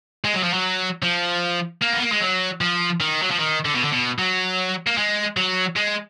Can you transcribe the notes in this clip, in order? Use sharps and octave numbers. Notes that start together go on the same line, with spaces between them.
G#3
F#3
F3
F#3
F3
A#3
B3
A#3
G#3
F#3
F3
D#3
F#3
F3
D#3
D3
B2
D3
B2
F#3
A#3
G#3
F#3
G#3